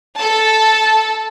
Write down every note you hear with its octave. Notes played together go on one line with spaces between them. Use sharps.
A4 A5